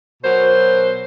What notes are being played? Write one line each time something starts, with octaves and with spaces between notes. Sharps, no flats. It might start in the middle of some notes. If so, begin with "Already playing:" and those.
B2 F#3 A#4 C5